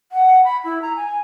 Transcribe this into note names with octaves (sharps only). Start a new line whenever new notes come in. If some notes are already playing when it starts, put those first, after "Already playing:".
F#5
B5
E4
A#5
G#5